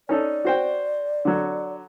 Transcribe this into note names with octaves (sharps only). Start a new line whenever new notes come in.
C#4 D#4 A4 D5
F#4 C5 G5
D3 F#3